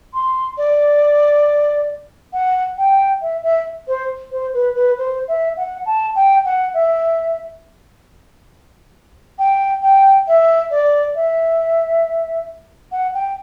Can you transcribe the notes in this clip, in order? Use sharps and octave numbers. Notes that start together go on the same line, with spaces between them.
C6
D5
F#5
G5
E5
E5
C5
C5
B4
B4
C5
E5
F#5
A5
G5
F#5
E5
G5
G5
E5
D5
E5
F#5
G5